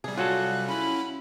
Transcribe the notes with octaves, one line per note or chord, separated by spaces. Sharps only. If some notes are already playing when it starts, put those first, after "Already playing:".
C3 G3 G#4
F#3 F4 F#4 G#4 A4 F#6
C#4 E4 B5